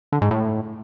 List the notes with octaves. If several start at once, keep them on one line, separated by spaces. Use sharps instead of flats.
D3
G#2
A2